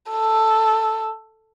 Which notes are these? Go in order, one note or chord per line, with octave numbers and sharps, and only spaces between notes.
A4